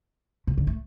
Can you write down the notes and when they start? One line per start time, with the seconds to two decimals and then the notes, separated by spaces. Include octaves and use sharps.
0.47 B2
0.58 D3
0.67 A3